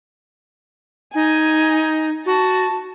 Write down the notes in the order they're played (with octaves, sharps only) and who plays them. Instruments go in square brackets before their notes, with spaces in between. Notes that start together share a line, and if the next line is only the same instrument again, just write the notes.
[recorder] D#4 [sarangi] G#5
[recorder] F#4 [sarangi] A5